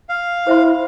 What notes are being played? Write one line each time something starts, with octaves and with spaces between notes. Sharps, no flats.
F5
E4 C5 E5 C6